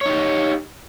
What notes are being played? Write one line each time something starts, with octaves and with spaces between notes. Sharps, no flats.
D#4 G4 C#5